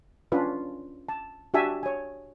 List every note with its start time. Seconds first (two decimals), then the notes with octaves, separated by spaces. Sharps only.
0.32 C#4 D4 F4 B4
1.09 A5
1.54 D4 F#4 G4 E5 G#5 A5
1.83 C#5 G#5